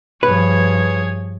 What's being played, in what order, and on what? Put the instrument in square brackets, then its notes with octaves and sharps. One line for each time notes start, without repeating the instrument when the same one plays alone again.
[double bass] G2 F3 [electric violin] G#4 C#5 [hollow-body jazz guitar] B4